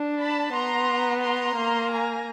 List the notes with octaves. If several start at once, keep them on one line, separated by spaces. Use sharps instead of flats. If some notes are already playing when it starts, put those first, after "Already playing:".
Already playing: D4
A5 B5
B3 A#5 C6
A#5 C6
A#3
G#5 A#5